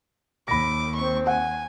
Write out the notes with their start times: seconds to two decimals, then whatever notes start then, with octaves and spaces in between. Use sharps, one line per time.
0.48 D#2 B5 D6 A#6
0.96 C4 C#6
1.27 F#5 G#5